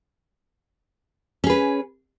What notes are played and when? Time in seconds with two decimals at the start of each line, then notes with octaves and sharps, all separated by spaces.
1.44 C#4
1.47 G#4
1.50 B4